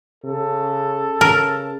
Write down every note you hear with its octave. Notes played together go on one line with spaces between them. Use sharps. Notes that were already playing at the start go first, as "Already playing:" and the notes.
C#3 A4
C#3 A#4 A5